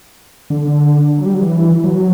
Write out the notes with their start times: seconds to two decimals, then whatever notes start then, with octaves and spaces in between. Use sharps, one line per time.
0.50 D3
1.18 F#3
1.26 G3
1.34 F#3
1.42 E3
1.84 F#3